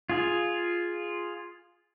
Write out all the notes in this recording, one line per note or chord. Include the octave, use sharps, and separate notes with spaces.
F4 G#4